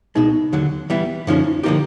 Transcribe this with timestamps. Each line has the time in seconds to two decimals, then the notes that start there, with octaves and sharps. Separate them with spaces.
0.15 C2 B2 G#3 D#4
0.53 D#2 D3 F#3
0.90 E3 G3 B3 E4
1.27 F#2 D3 F3 G#3 C#4 D#4
1.45 E4
1.63 D3 F3 A#3 D#4 E4 G4